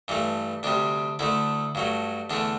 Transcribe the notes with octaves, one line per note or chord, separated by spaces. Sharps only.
G2 E3 A3
D2 C3 G3 D4
D2 D3 A3 E4
G2 F#3 A3
E2 D3 A3 D4